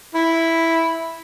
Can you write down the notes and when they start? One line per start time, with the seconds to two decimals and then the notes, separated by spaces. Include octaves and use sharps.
0.14 E4